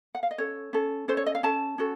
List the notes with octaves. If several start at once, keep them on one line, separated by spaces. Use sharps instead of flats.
F#5
F5
D#5
C#4 A4 C#5
C#4 A4
C#4 A4 C5
C#5
D#5
F5
C#4 A4 A5
C#4 F#4 A4